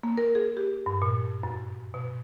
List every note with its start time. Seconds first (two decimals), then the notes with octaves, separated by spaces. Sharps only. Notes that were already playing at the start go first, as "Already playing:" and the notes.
0.03 A#3
0.17 A#4
0.35 G#4
0.57 G4
0.86 G2
1.02 A#2
1.43 F#2
1.94 B2